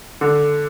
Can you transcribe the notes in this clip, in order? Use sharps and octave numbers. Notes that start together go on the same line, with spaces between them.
D3